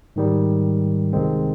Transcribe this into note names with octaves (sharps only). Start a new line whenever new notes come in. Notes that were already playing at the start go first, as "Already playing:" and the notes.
G#2 D#3 G3
C#2 C3 D#3 G#3 C4